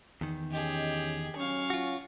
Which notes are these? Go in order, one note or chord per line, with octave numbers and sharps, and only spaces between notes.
E2 D#3
C#4 G4 G#4 D#5
F#3 C#4 F5 C#6
F4 F#4